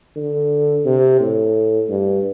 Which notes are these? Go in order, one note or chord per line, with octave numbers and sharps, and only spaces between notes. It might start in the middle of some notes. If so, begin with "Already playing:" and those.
D3
C3
A2
G2